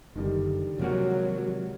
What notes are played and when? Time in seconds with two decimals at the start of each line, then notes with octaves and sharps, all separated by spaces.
0.15 F#1 D3 D#3 G3
0.79 D#2 C3 F3 F#3 G#3 A#3 F#4